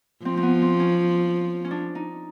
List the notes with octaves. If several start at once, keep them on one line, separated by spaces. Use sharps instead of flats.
F3 C4
C4
B3
C4
C#4
C#4
D4
D#4